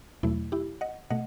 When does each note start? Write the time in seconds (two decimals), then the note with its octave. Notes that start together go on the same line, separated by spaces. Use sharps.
0.23 E2 B2 F#3 A3 E4
0.52 E4 G4
0.81 D#5 F#5
1.10 B2 A3 D#5 F#5